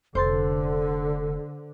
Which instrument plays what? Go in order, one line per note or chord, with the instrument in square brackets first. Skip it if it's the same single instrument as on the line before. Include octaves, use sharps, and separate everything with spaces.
[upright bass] F1 [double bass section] D3 [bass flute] A4 [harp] C5 C6 A6